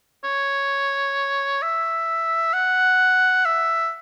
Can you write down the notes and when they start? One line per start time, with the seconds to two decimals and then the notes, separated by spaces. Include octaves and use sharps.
0.24 C#5
1.62 E5
2.54 F#5
3.45 E5